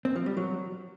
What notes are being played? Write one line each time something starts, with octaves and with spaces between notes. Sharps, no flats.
C4
F3
G3
F#3